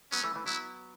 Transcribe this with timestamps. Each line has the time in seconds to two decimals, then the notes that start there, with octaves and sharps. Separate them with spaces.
0.12 F#3 B3 C#4
0.24 E3 A3
0.35 E3 A3
0.46 F#3 B3 E4